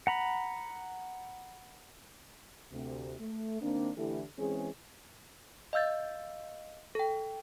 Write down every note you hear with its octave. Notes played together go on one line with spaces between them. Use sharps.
F#5 A#5 B5
D2 C3
A3
D#3 A#3 C4 D4
D3 E3 A3 E4 G4 A4
E3 G#3 C4 C#4 G#4
D#5 F5 E6 G6 A6
A4 G5